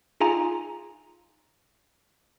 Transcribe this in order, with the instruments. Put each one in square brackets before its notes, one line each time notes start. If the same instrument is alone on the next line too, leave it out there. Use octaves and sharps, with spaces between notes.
[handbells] D#4 F4 G#4 G#5 A#5